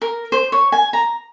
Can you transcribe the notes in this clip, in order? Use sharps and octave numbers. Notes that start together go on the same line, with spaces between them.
A#4
C5
C#5
G#5
A#5